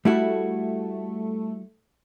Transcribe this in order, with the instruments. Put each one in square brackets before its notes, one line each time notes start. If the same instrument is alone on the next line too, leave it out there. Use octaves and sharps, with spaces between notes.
[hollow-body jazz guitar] G3 E4 F#4 [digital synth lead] A3